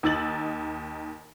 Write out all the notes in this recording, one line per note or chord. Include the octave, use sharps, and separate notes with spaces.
D#2 D#4 E6 A6 F#7